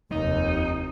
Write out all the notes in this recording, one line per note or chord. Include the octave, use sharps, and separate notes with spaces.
F1 D#2 D#4